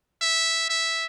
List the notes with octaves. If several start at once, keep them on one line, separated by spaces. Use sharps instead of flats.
E5
E5